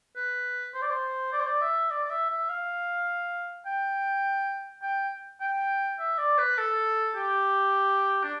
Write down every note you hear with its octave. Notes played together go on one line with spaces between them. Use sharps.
B4
C5
D5
C5
D5
C5
D5
E5
D5
D5
E5
E5
F5
G5
G5
G5
E5
D5
B4
A4
G4
D4